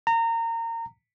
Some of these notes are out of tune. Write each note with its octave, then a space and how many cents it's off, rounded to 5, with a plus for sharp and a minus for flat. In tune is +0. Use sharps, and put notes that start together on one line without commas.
A#5 -25